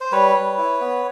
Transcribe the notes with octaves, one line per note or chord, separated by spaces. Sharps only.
C5
G3 B4 C#5
G3
E4
B3